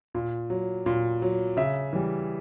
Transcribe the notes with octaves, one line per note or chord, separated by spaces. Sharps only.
A#2
F#3
A#2
F#3
C#3 E5
E3 G3